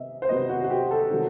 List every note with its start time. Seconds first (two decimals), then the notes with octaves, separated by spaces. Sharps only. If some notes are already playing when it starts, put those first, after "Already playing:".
Already playing: C3 B3 D#5 E5
0.22 C5
0.29 C3 F#3 B3 D#5
0.49 F#4
0.64 F#4
0.70 G4
0.91 A4
1.10 C3 D#3 F#3